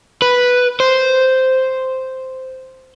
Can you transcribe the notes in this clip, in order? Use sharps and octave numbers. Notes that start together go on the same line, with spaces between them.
B4
C5